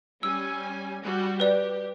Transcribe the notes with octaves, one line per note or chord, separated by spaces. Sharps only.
G3 C#4 G#5 E6
G3 F#4
G4 B4 D5